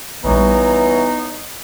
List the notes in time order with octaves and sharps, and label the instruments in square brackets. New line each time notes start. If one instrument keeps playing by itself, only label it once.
[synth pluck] A#1 D3 G3 [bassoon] E3 [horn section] B3 C#5 A#5 [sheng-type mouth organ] D#4